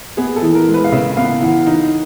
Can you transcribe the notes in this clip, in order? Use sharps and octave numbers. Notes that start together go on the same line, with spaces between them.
B3 G#4
A4
E3
A#4
G#3
B4
F5
C#3 E5
B3 F5
E3 F#5
D#4